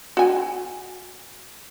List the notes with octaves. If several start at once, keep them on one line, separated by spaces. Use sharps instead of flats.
F#4 G#5